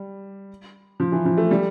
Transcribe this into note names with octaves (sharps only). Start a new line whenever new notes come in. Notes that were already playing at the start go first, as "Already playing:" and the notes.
Already playing: G3
F3
E3
F3
A3
G3